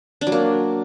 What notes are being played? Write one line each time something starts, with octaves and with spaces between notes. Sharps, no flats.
D4
F#3
A#3